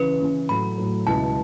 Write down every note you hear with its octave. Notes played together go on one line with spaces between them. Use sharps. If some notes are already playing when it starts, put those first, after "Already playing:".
Already playing: C#3 E3 C#4 B4
C#3 E3 C#4
A2 F#3 A3 B5
A2 F#3 A3
C#2 B2 B3 E4 A5